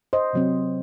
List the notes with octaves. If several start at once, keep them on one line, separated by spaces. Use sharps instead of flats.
C5 D#5
C3 F#3 C4